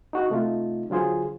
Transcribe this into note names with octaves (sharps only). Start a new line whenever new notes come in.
D#4 F#4
C3 A3 D#4 F4
D3 F#3 F4 G#4 C5